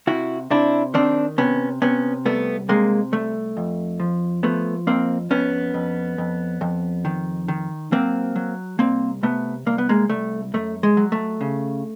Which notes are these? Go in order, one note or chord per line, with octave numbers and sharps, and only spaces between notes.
C3 E4 F#4
C3 D4 E4
D#3 C4 D4
C3 B3 C#4
C3 B3 C#4
C2 A3 B3
C3 G#3 A#3
C2 A3
F2
F3
F3 A3 B3
F2 A#3 C4
F2 B3 C#4
F2
F2
F2
D#3
D#3
F#3 A#3 C4
F#3
C2 A#3 C4
C3 A3 B3
C2 A#3
B3
G#3 A#3
C2 A3
F#2 A3
G#3
F#3
A3
C#3